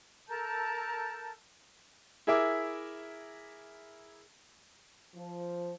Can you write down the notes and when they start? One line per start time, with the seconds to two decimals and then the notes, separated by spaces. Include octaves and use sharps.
0.28 A4 A#4 A5 G6
2.27 E4 G#4 A#4 E5 D6
5.15 F3